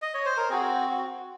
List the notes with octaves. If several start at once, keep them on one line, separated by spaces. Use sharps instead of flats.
D#5
C#5
C5
A#4
C4 F#4 G#4
F#4